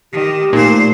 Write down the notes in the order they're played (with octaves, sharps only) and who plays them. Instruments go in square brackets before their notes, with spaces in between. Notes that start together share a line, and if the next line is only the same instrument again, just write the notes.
[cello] D#3 [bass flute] G4
[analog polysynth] A#2 [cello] A3 C5 [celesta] D#4